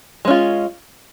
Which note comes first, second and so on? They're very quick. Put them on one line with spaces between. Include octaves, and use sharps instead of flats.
G#3 C#4 F4